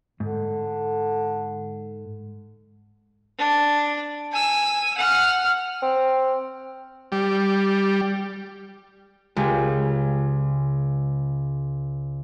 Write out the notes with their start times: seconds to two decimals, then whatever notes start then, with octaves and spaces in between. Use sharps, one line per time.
0.20 G#2 D3
3.39 D4
4.32 G#5 E6
4.98 F#5 F6
5.82 C4
7.12 G3
9.37 C#2 G#3 G4 G#4